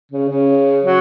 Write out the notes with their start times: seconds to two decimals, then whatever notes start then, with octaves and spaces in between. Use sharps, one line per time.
0.11 C#3
0.29 C#3
0.84 F#3